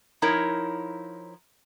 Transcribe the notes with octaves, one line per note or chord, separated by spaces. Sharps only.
F3 D#4 E4 A#4 C#5